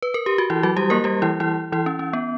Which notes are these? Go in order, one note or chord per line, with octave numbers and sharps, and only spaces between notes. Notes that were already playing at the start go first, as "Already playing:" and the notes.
B4
A#4
G4
F#4
E3 E4
F#3 F#4
G3 G4
A#3 A#4
G3 G4
E3 E4
E3 E4
E3 E4
C#4
C#4
B3